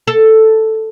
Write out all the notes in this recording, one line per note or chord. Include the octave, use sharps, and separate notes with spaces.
A4